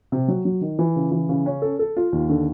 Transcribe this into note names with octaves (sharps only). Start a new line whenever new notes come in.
C3
F#3
F#3
D#3
E3
C#3
E3
C#3
C#4
A4
A4
F4
D#2
D3